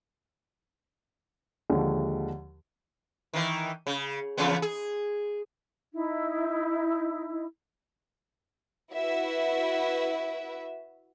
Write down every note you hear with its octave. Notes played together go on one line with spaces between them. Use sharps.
D#2 D3 F3 G#3
D#3 E3
C#3
E2 C#3 B3
G#4
D#4 E4
E4 F#4 B4 E5